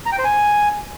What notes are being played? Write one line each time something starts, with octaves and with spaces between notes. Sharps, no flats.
A#5
G5
C5
G#5